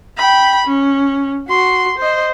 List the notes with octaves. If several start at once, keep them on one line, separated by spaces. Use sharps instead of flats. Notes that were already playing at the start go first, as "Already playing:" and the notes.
G5 B5
C#4
F#4 C6
C5 D#5